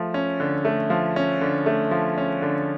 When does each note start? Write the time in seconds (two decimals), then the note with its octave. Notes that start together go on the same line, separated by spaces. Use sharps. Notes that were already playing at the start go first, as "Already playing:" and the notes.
Already playing: F3 A3
0.14 C#4
0.40 D3
0.65 A3
0.90 F3
1.16 C#4
1.41 D3
1.66 A3
1.91 F3
2.18 C#4
2.42 D3